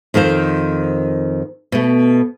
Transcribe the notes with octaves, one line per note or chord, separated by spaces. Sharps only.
F2 D#3 F4 C5
B2 A3